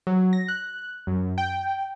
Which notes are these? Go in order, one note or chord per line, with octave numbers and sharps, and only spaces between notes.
F#3
A#6
F#6
F#2
G5